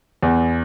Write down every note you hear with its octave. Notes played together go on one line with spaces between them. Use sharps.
E2